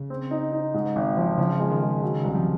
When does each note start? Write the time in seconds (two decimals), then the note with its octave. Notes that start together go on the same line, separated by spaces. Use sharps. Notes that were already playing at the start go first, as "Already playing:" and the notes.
Already playing: C#3
0.10 C4
0.31 D#4
0.52 D#4
0.74 G#2
0.96 G#1
1.17 F3
1.38 C#3 F3
1.59 G#3
1.70 D#3
1.81 G#3
2.02 C#3 F#3
2.18 C#3
2.24 C2
2.35 F3